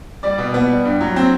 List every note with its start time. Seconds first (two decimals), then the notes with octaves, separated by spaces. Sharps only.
0.23 G3 D5
0.38 B2
0.54 B3
0.69 G3
0.85 G2
1.01 F#3
1.16 C4